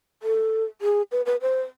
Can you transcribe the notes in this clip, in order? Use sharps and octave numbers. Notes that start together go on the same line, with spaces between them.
A4
G#4
B4
B4
C5